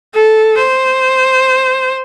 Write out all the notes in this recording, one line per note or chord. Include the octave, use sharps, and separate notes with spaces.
A4
C5